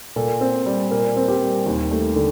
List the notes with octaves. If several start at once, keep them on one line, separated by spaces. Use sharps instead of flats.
A#2 A4
C4
G3
A#2 A#4
C4
G4
G3
D#2 G4
A3
D3